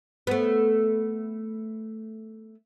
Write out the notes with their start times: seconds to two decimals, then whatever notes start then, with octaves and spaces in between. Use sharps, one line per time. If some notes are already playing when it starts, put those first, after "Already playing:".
0.27 A3 B3